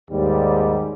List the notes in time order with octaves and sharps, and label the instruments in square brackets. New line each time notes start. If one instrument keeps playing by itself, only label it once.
[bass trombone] D#2 [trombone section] G#2 G3